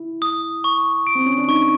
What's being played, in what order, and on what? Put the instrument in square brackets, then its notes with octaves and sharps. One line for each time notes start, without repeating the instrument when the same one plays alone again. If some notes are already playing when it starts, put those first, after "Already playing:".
Already playing: [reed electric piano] E4
[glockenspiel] D#6
C#6
D7
[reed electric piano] C4
C#4
D4
[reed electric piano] D#4 [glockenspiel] C#6